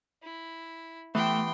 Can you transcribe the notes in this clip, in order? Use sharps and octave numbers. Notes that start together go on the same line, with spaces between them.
E4
E3 A3 B3 G4 G5 C6